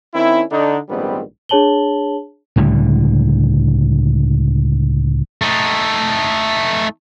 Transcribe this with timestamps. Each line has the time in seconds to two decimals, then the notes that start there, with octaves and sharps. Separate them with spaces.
0.14 D#3 C4 C#4 E4
0.51 D3 D4 D#4
0.89 A#1 G#2 D#3 G3 B3 C4
1.49 D4 G#4 C#5 A5 F#7 G7
2.56 C#2 A2 D3 G3
5.42 A3 D#4